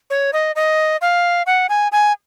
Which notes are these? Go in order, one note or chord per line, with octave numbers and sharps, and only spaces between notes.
C#5
D#5
D#5
F5
F#5
G#5
G#5